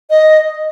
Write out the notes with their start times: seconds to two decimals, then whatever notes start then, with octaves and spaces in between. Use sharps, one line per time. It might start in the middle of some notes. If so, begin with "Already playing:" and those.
0.10 D#5